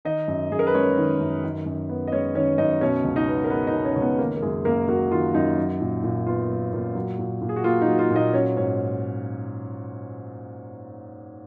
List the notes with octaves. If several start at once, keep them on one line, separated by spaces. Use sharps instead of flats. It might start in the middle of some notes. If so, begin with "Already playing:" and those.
D#3 D#4 D#5
F#2
F#2 G#4
A#4
B4
G#3 C#4 C#5
D#3
F#2
D#3
F#2
B3
D#5
G#3 C#4 C#5
D#3 C#4 C#5
F#2 D#4 D#5
B2 C#4 C#5
C#2
D#4 D#5
B3
A#4
G#3 B3 B4
D#4 D#5
B2
C#4 C#5
C#2 C#5
B3 B4
D#3 A#3 A#4
A#4
F#2 G#3 G#4
F#2 A#3 A#4
F#3 A#3 F#4
D#3 F4
F#2 D#4
F#3
A#2
A#2
B3 F4
F#3
A#2
F#3
A#2
A#2
G#4
F#4
A#3 F4
D#4
F#3
F4
A#2
D#4 D#5
F#3 C#4 C#5
G#2 C#4 C#5